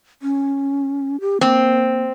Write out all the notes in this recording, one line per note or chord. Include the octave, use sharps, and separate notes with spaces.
C#4
G4
A#3 C4